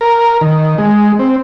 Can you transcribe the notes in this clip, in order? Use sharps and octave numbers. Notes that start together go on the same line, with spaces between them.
A#4
D#3
G#3
C4